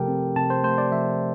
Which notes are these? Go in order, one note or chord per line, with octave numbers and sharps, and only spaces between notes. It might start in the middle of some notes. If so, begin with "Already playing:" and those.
Already playing: C3 F3 A3 G4 A4 A#4 G5
C4
C3 A5
C5
A3 C5
D5
F3 E5